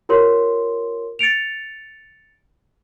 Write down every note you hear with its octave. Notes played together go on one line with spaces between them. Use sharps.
F4 G4 A#4 C#5 C6
A6 C#7 D7 F7